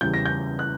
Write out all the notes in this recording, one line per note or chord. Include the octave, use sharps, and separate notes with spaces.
E2 C#3 G3 G6
A#6
G6
F#6